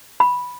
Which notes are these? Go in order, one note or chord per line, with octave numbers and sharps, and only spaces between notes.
B5